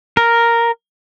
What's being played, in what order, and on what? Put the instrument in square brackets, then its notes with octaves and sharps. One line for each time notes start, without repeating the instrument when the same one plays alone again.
[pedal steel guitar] A#4